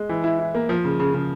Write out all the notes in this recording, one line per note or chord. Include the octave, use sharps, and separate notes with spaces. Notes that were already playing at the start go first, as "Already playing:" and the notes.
Already playing: G#3
E3
E4
E4
A#3
F3
C#3
C#3
C#3